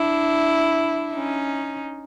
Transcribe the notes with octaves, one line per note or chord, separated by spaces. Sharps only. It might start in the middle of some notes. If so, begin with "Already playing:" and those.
Already playing: D4 E4
C#4 D#4